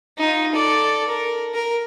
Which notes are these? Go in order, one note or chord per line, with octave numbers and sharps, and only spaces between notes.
D#4 F4
A4 D5
A#4
A#4